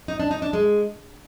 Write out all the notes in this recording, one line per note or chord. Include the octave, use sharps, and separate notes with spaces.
D#4
D4
D#4
D4
G#3